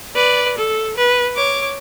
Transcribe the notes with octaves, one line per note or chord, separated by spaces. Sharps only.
B4 D5
A4
B4
C#5 D6